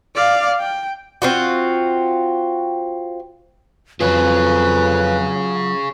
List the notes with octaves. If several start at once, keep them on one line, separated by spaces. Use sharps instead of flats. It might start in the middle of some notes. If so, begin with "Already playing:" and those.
D5 F5
G5
C4 F4 F#4
F2 F#3 F4 G#4 B4 C#5